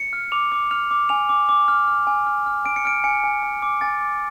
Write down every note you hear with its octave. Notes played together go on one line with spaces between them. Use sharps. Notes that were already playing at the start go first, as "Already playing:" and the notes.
Already playing: C#7
F6
D6 F7
D6
F6 F7
D6
G#5 F7
D6
D6
F6
F6
G#5
F6
F6
G#5 D7
C#7
F6 D7
G#5 C#7
G#5
G#5
D6
G#5 A6
D6